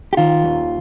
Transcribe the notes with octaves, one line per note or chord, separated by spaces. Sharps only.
G4
D#3 F4
D#2